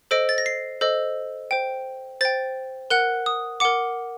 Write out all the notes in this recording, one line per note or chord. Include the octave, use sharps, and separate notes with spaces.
A4 C5 D#5 D7
A6
A#6
C7
A4 C5 D#5
C5 G5
C5 G5 A6
A#4 F#5 F#6
D#6
A#4 F#5 D6